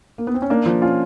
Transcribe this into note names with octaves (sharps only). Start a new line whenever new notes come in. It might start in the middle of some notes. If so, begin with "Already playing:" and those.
A#3
B3
C4
C#4
A#3 D4
F3
C#4 F4